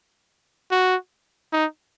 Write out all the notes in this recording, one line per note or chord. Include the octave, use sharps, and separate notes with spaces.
F#4
D#4